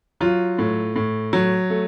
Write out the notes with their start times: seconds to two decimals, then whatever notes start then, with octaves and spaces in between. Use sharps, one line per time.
0.21 F#3 F4
0.58 A2
0.96 A2
1.33 F#3
1.70 A3